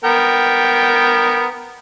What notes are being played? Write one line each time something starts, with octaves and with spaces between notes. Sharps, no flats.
B3 A#4 G5